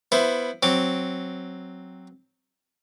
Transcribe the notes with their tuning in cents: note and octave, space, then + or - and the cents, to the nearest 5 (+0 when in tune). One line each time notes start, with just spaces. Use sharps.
B3 +0 E4 +10 C5 +0
F#3 +0 C4 +0 D6 +0